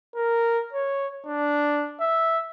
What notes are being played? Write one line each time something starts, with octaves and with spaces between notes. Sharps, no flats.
A#4
C#5
D4
E5